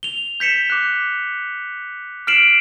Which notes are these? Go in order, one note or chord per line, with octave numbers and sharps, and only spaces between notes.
F7 G7
G6 B6 C#7 E7
D6 F#6
F6 B6 C7 D7 E7 F#7